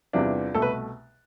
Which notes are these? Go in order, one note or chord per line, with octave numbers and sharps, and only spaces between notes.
E2 C3 E3 G3 D4 F4
C2 B2 A3 A4
B4